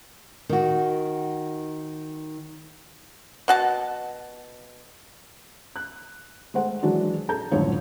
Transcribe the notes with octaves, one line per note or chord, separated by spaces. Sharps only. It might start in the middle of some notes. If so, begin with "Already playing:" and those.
D#3 F#4
B2 F#4 A5
F#6
G#3 A3 C5 F#5
E3 F#3 G#3 D4 F#4 G#4
G#4 A4 A5 A#5 G6
C#2 F#2 A2 D3 F3 C#5